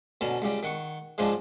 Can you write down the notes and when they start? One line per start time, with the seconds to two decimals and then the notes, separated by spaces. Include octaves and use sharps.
0.21 B2 D3 C#4 A5 A#5
0.42 C#2 C#3 G3
0.63 D#3 F#5 C#6
1.18 G#2 C#3 F3 G#3 D4